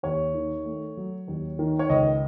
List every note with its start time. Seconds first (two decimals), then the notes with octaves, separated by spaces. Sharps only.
0.03 D#2 C#5
0.35 D#3
0.66 A3
0.97 F#3
1.28 D#2
1.59 D#3
1.79 C#5
1.90 C#2 D#5